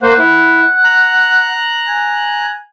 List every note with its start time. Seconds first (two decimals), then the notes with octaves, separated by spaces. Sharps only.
0.02 A#3 C5 F#5
0.19 E4
0.84 A#5 F#6
1.88 G#5